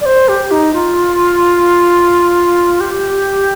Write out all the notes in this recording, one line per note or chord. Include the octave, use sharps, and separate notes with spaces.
D5
C5
G4
D#4
F4
G4